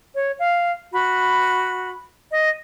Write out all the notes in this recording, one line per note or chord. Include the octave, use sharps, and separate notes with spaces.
C#5
F5
F#4 B5
D#5